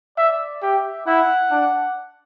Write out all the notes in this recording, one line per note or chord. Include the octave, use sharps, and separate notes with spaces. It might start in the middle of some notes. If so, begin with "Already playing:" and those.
D5 E5
G4 E5
E4 F#5
D4